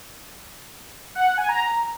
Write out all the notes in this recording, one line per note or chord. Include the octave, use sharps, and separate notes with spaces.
F#5
F#5
G#5
A#5